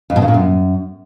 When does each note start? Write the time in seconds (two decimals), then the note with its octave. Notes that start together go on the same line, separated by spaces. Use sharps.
0.10 F2
0.16 B2
0.22 C#3
0.28 A#2
0.34 F#2